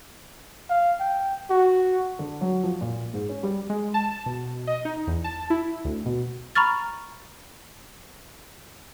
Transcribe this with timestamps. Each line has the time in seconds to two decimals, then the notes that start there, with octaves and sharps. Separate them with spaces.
0.70 F5
1.00 G5
1.50 F#4
2.19 D3
2.41 F#3
2.63 F3
2.81 A#2
3.13 G#2
3.29 C#4
3.43 G3
3.70 G#3
3.94 A5
4.26 B2
4.67 D#5
4.85 D#4
5.07 E2
5.24 A5
5.50 E4
5.84 D2
6.06 B2
6.55 A#5 B5 C#6 F6 A6